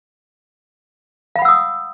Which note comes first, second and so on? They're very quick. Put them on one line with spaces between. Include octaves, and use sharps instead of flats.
F5 B5 F#5 E6 D#6